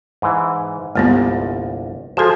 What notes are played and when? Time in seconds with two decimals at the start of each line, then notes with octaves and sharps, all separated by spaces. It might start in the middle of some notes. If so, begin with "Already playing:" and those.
0.22 G#2 E3
0.95 G1 C2 G#3 A#3 B3
2.17 F3 G#3 F#4 G#4 A4